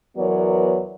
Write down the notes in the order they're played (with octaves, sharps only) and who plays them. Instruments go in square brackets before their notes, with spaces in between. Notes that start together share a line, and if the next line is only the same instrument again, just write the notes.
[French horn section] E2 F#3 B3 A#4 C#5 D5